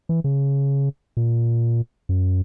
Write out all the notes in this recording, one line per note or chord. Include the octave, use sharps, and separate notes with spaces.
E3
C#3
A#2
F#2